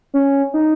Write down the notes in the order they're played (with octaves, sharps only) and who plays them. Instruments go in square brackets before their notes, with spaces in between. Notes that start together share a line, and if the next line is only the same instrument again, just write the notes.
[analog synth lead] C#4
D#4